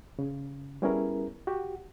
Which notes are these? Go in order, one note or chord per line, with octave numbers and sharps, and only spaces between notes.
C#3
G3 B3 C#4 E4 G#4 A#4
F#4 G4